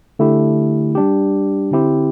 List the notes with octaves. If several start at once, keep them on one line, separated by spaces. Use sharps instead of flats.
D3 A3 E4 G4
G3 D4 G4
D3 C4 E4 G4